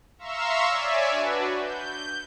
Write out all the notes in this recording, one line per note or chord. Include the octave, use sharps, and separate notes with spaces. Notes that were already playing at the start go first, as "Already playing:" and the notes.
E5 F5 A#5 C6 C#6 E6
C#5 D5 E5 G#5
D4 F#4 B4
G6